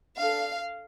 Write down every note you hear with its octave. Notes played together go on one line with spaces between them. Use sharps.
D4 A4 F5